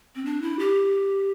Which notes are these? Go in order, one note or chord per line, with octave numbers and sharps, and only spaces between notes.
C4
D4
E4
G4